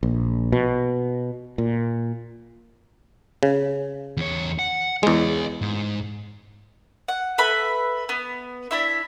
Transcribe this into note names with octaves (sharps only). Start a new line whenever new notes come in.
A#1
B2
A#2
C#3
E2 C#5
F#5
E2 G#3 C#5 D#5
G#2
F#5
A4 B4 E5 B5
B3
D4 E4 E5